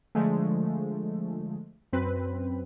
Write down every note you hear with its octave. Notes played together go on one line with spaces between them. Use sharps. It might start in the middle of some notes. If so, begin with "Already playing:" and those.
D3 F3 G#3 A3
F#2 C4 B4